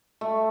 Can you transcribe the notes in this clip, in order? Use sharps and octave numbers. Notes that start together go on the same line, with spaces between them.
A3